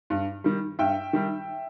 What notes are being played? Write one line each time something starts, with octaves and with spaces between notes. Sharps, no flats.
G2
D#3 G3
G2 E5 G5
D#3 G3